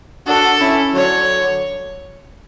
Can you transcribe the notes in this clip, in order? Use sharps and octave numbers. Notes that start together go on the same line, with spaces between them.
D4 F#4 A4
C#4 E4
D3 F#3 C#5